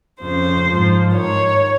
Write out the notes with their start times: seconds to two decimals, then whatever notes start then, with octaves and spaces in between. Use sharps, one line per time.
0.21 F2 C#3 F3 C5
0.69 G#2 F3
1.15 G#2 D#3 C#5